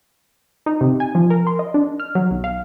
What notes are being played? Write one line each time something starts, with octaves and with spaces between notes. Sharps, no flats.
D#4
C3
G#5
F3
A#4
C6
D#5
D4
F6
F#3
B1
F5